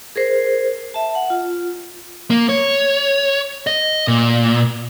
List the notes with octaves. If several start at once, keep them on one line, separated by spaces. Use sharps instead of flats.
G#4 A#4 C5
E5 A5
F#5
F4
A#3
C#5
D#5
A#2